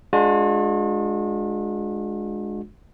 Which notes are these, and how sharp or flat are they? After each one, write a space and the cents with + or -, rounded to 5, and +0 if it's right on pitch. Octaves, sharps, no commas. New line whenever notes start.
G#3 +10 D4 +15 F#4 -45